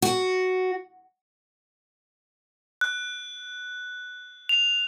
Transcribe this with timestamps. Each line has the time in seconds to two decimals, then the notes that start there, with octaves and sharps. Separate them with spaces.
0.02 F#4
2.81 F#6
4.49 F7